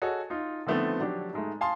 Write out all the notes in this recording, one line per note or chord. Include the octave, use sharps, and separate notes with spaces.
F#4 G#4 A4 C#5 D#5
D#4 F4
D3 D#3 F3 A3 B3 C4
F3 F#3 D4 G4
G#2 G#3 A3
F5 G#5 A5 C6 D#6